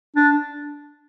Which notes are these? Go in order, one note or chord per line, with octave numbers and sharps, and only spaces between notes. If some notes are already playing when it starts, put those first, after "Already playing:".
D4